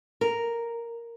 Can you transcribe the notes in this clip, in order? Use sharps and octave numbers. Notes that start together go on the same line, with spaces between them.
A#4